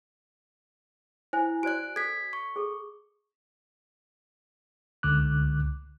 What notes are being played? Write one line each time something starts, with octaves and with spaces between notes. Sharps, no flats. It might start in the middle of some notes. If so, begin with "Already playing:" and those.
E4 C5 G#5
F#4 C5 D5 F#6 D7
A4 G#6 B6
C#6
G#4 A4
C#2 D3 D6 F#6